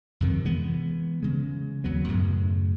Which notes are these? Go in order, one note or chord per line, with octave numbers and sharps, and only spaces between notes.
F2 C3 D#3
E3 G#3 B3
C#3 G#3
D#2 F#3 B3
F#2 A2 C#3